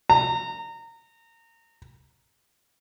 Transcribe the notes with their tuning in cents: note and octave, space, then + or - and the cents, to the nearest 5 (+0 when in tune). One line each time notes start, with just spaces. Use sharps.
A#5 -25